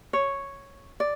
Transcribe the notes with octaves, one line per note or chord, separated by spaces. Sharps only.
C#5
D5